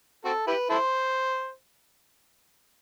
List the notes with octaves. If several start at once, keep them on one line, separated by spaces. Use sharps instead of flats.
C4 F#4 A4
E4 G4 B4
E4 A4 C5